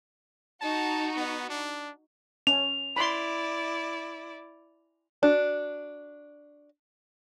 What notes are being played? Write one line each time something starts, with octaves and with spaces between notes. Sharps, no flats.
D#4 F#4 A5
B3
D4
C#4 F7
E4 D5 B5 C6
D4 F#4